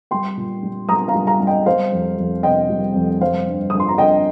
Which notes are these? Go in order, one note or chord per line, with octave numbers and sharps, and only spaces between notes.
G3 G5 C6
A#2
G3
G3 A#5 D#6
F5 A#5
G3
F5 A#5
G3
D#5 G5
G3 C5 F5
F2
F2
C3 D#5 G5
G3
F2
G3 C5 F5
G2
G2 D#6
C6
A#5
G2 D#5 G5